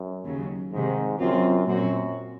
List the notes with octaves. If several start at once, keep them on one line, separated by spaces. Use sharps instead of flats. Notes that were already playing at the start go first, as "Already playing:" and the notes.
Already playing: F#2
D#2 C#3 F#3
G#2 C3 D#3 G#3
F#2 C3 F#3 C4 F4
F#2 A#2 F#3 C4 F#4